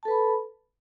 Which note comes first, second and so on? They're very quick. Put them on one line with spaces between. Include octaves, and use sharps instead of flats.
A5 A4 B4 B5